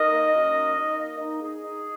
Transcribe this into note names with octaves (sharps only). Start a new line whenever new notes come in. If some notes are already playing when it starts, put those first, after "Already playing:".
Already playing: D#4 A#4 D#5
A#3
F#2
D#4
D#4
A#3
D#4
D#4 G#4
D#4